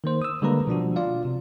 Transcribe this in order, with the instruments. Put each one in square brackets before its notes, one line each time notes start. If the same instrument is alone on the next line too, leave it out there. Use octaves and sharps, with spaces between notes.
[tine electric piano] D#3 A#3 C5
D#6 E6
D3 G3 G#3 A#3 B4 A#5
B2 F3 D4 F#4
F4 D5 F5
C3